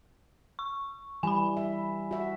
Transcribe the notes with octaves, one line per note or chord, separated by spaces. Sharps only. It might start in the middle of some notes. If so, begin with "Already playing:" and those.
C#6
E3 G3 G#5 B5
E5
F#4 E5